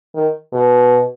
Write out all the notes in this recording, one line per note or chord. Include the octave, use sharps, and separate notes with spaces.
D#3
B2